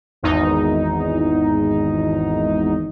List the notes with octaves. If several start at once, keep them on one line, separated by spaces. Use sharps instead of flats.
G#1 E2 D#4